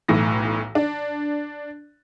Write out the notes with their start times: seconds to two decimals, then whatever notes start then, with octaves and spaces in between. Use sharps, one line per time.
0.08 B1 A2 E3 A#6
0.75 D4